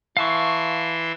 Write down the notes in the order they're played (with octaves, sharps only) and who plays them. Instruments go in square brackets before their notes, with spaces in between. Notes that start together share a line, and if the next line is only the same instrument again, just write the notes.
[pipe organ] E3 E5 C6 [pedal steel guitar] F5 A5 C#6